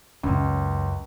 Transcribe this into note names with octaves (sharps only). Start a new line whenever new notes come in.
C#2 F#2